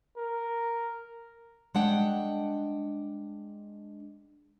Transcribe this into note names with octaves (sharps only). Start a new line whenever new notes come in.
A#4
G#3 D4 F#5 G5